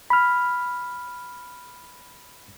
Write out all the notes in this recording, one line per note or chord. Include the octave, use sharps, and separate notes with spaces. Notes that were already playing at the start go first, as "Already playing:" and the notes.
B5 F6